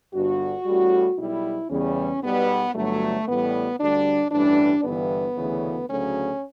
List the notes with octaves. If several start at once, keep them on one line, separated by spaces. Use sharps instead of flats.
G1 G2 D3 F#4
A1 A2 G3
B1 B2 G3 E4
E2 C#3 G3 C#4
B1 B2 G3 B3
G1 G2 F#3 A3
A1 A2 G3 B3
D2 D3 G3 D4
A1 G2 E3 G3 D4
G1 G2 E3 B3
D2 C#3 E3
D2 C#3 F#3 C#4